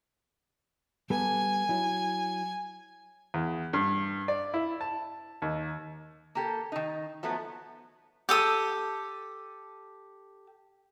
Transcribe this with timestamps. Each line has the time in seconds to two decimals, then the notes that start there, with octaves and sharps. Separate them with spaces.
1.10 G3 B3 A4 G#5
1.69 F#3 E4
3.34 E2
3.73 G2
4.28 D5
4.54 E4
4.81 A5
5.42 D#2
6.35 A#3 G4 A4
6.72 D#3 D#4
7.23 F3 F#3 A3 B3
8.29 G4 A4 D#6